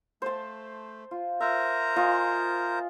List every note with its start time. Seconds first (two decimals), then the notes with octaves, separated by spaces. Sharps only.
0.22 A3 C5 A5
1.11 F4
1.40 A#4 C5 E5 A#5
1.96 F4 D#5 G#5